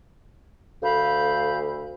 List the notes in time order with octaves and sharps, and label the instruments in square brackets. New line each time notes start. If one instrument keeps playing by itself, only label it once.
[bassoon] D2 [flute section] F5 B5 G6